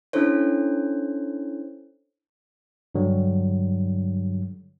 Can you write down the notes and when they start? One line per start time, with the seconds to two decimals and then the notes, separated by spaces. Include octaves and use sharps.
0.13 C#4 D4 E4 A4 C5 C#5
2.95 G2 D3 F#3 G3